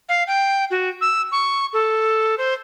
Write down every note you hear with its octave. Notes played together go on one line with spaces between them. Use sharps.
F5
G5
F#4
E6
C#6
A4
C5